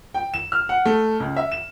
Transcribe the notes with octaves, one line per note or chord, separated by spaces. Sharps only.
G5
E7
F6
F#5
A3
C#2
E5
E7